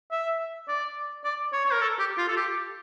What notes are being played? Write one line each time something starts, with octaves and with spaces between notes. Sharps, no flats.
E5
D5
D5
C#5
C#5
A#4
A4
G4
F4
A4
G4